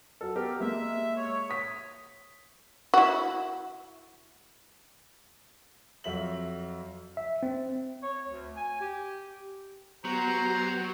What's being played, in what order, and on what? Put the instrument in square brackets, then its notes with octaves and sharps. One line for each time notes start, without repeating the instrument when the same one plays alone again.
[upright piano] F#3 A4
B3 G4 A#4
[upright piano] G#3 A#3 [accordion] E5
[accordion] C#5
[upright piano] D#6 B6
[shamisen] E4 F#4
[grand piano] F2 F#3 E5 F#7
[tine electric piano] E5
C4
[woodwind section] C#5
D2
G#5
G4
[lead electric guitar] F#3 [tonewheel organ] B3 G4 [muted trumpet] C5 [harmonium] A#5